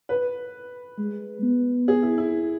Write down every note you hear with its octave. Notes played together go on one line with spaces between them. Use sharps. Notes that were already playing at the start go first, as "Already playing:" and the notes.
B4
G#3
B3
G#4
E4
E4